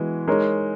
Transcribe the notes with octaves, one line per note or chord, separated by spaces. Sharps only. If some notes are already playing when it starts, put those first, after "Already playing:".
Already playing: E3 G#3 B3 F#4
G#3 D#4 A#4 C#5